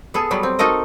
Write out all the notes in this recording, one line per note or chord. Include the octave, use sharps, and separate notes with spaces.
B3 G#4 A4
F#3 G3 B3
C4
D#4 F#4 A4 A#4 D#5